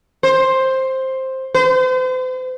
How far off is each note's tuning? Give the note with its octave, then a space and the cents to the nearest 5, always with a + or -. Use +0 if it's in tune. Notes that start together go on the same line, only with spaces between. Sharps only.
C5 +10
C5 -40